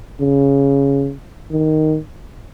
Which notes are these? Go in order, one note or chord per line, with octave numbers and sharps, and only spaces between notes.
C#3
D#3